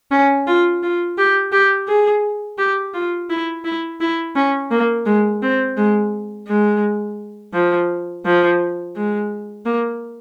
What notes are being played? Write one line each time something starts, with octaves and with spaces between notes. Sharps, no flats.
C#4
F4
F4
G4
G4
G#4
G4
F4
E4
E4
E4
C#4
A#3
G#3
C4
G#3
G#3
F3
F3
G#3
A#3